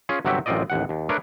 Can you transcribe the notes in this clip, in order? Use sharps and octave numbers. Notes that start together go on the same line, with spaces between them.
C#4 F4 G#4
G1 C3 F#3 F#4 G4 E5
A1 F#2 C4 F4 D5 D#5
A1 D#2 F#5
D#2
A3 D4 A#4 B4 C#5